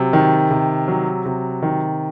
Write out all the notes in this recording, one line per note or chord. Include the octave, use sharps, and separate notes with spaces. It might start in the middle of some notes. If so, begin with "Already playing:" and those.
Already playing: C3 F#3
D#3
C3
F#3
C3
D#3